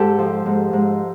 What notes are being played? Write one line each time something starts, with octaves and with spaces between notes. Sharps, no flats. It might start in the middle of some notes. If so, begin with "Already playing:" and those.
Already playing: G#2 G4 A4
F3
G#2
G#2